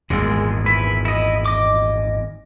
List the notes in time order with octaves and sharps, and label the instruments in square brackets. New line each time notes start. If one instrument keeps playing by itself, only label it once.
[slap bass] G#1 E2 A#2 [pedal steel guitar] G#3
[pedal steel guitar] E4 B4
E4 D#5
D#5 D6